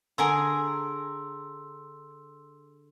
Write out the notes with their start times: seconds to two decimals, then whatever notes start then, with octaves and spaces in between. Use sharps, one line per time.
0.18 D3 G#4 A#4 G#5 A#5 C6 E6